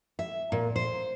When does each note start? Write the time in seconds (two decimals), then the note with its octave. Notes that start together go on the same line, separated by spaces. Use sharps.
0.19 E5
0.52 A#2
0.76 C5